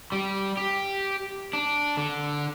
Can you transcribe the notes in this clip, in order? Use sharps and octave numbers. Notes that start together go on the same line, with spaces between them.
G3
G4
D4
D3